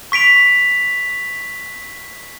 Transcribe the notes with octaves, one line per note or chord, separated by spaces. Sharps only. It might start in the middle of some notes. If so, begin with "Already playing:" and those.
C#6 B6 D7 F7